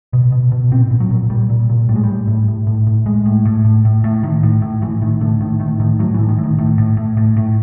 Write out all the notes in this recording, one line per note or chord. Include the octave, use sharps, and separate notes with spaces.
B2
B2
B2
A#2 C4
A#2
F#3
A#2
A#2 G3
A#2
A#2
A2 G3
G#3
G3
A2
A2
A2
A2
A2
A2 G#3
A2
A2
A2
A2
A2
A2 D#3
A2
A2
A2 E3
A2 D#3
A2 D3
A2 D#3
A2 D#3
A2 D#3
A2 F#3
E3
A2
D#3
A2
D#3
A2
A2
A2
A2
A2